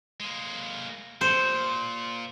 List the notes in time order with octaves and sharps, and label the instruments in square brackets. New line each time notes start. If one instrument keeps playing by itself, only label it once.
[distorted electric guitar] G#3 A#3
[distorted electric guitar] A#2 [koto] C5